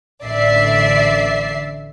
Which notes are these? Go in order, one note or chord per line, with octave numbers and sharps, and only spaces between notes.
A1 D3 D5 E5 C7